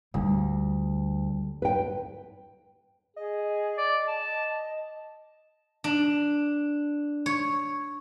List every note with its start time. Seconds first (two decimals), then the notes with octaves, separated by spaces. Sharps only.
0.14 D2 G3
1.62 B4 G5
3.16 G#4 D#5
3.77 D5
4.08 A5
5.84 D4
7.26 C#5